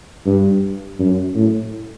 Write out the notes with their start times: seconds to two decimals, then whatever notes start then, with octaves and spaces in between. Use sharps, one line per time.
0.26 G2
0.99 F#2
1.35 A2